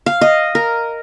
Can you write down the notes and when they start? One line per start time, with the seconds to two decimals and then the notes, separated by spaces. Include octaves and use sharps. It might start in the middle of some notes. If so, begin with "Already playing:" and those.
0.06 F5
0.21 D#5
0.55 A#4